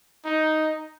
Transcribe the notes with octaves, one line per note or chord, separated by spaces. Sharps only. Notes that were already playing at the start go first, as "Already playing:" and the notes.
D#4